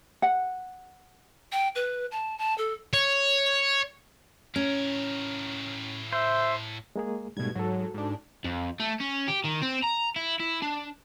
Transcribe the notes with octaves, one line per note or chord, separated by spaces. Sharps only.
F#5
G5
B4
A5
A5
A4
C#5
A2 C#4 A#4
C5 E5
G#3 A#3 G#4
G#2 B2 G3 A3 G#6
G#2 F#3 F#4 A4
G#2 D4
F2
A3
C#4
G4
D#3
C4
A#5
E4
E4
D4